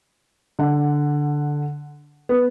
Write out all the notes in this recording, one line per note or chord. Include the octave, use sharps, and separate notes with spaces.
D3 F#5
B3